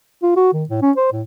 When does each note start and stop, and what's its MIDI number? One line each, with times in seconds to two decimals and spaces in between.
0.23 0.36 65
0.36 0.53 66
0.54 0.64 51
0.69 0.81 45
0.82 0.91 61
0.97 1.10 72
1.12 1.22 45